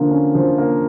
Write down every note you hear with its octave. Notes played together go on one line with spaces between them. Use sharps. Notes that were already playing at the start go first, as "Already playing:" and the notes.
Already playing: D3 F3 A#3
C#4
F3
A#3